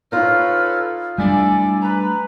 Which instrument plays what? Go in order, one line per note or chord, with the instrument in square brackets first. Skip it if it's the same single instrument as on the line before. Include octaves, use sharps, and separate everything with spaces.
[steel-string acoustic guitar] D#4 F4 [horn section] A4 B4 C#5 [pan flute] F6
[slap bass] G3 A3 D4 [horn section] E4 A4 D5 [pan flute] G#5
[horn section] B4 [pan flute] A#5